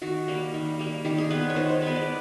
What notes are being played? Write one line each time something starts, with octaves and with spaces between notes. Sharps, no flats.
D#3 F#4
G3 A#3
D#3
G3 A#3
D#3 G4
G#4
G#3 B3 B4
C#5
D#3 C5
C5
G#3 B3 B4
D5